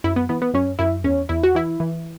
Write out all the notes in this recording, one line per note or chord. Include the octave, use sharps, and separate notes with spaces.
F#2 E4
B3
E3 B3
B3
F#2 C#4
F#2 E4
E2 C#4
E2 E4
F#4
E3 E4
E3